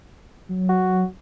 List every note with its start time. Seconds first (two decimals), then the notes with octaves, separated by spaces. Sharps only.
0.49 F#3
0.69 F#4